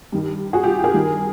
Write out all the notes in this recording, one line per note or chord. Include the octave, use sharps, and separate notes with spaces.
G2 D#3
F#4 G#4
F4 G4
G#4 A#4
G2 D#3